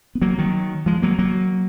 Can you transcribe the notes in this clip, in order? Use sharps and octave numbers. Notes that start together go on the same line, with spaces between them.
B3
F#3 A#3
D#3 F#3
F3 G#3
F#3 A#3
F#3 A#3